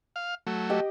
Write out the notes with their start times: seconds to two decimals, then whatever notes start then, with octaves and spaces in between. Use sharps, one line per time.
0.16 F5
0.47 F#3 A3
0.70 G4 D#5 G5